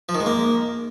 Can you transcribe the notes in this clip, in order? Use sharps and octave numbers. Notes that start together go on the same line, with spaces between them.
F3
D#3
G#3
A#3